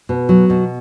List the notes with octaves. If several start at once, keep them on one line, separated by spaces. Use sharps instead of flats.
B2
F#3
B2